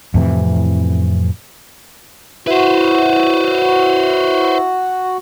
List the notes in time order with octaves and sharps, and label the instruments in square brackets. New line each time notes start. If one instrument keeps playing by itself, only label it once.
[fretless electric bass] F2 A2 C3 E3
[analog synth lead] E4 [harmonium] F#4 [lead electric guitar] B4 C5